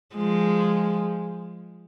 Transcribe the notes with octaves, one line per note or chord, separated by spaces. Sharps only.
F3 G#3